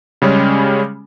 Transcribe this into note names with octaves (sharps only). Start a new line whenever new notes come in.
C#3 G3 G#3 C#4